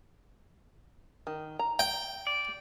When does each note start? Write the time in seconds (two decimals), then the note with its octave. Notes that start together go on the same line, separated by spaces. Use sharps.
1.27 D#3
1.59 A#5
1.79 G5
2.27 D5